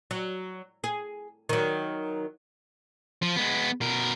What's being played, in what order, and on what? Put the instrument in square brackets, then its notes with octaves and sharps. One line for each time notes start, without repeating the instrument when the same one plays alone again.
[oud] F#3
G#4
D#3 F#3
[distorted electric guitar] F3
G#3 B3
B2 A#4